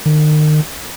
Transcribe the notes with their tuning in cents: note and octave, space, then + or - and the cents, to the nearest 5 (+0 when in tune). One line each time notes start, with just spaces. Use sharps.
D#3 -35